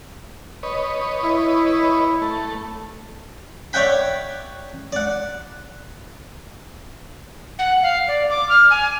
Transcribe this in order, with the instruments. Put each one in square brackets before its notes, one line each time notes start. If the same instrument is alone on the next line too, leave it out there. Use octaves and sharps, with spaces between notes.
[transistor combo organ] B4 C#5 D#5
[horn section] E4
[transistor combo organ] A3
[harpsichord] C#5 D5 E5 F#5 G5 B5
D5 F#5
[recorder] F#5
F5
D5
D6
F6
G#5